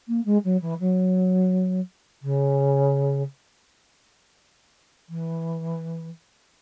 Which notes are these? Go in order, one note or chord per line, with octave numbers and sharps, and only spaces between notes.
A#3
G#3
F#3
E3
F#3
C#3
E3